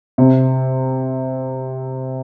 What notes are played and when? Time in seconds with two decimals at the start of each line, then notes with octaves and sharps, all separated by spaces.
0.18 C3